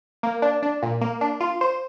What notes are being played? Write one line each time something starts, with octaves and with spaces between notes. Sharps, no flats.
A#3
D4
D4
A#2
A#3
D4
F4
C5